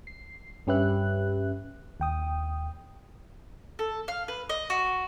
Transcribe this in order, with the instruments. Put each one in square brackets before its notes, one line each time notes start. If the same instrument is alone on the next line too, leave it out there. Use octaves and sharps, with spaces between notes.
[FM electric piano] C7
G2 C#4 G4 B4 E5 F#6
D#2 G5 D#6
[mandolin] A4
F5
B4
D#5
F#4